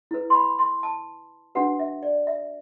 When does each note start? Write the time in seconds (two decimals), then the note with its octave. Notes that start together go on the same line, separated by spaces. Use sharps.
0.11 E4 B4
0.30 C6
0.35 B5
0.59 C6
0.83 A5
1.55 D4 F#4 B4 F#5
1.79 E5
2.03 D5
2.27 E5